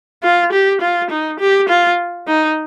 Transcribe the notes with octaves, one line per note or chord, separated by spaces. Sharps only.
F4
G4
F4
D#4
G4
F4
D#4